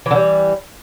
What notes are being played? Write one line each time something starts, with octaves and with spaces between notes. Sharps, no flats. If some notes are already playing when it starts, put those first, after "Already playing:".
D3 E3 G3